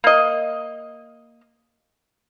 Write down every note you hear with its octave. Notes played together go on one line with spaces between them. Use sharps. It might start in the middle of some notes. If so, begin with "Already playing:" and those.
A#3 D#5